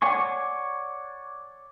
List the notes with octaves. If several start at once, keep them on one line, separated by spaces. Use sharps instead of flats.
C#5 D5 F#5 G#5 C#6